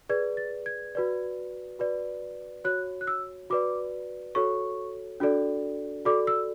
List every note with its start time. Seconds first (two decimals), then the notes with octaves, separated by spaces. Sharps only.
0.09 G#4 B4 D5 G#6
0.37 A6
0.66 G#6
0.95 F#4 B4 D5
1.79 F#4 B4 D5
2.64 F#4 C#5 F#6
3.01 F#6
3.07 E6
3.50 F#4 B4 D5 D6
4.35 F#4 A4 C#5 C#6
5.20 D4 F#4 A4 D5
6.05 F#4 A4 D5 D6
6.27 E6